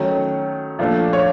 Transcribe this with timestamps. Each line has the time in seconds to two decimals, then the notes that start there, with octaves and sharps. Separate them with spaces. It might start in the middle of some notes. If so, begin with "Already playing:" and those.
Already playing: D#3 F#3 A3 C#4
0.79 A#2 F3 A3 D4
1.13 C#5